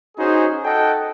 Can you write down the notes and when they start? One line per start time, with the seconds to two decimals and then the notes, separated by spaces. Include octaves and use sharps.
0.18 C#4 D#4 F#4 G#4 C5
0.63 A4 D#5 F#5 G5